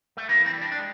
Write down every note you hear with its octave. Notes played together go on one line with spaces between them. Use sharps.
A3
E3 A#3
C4
G3
D4
D4
G#3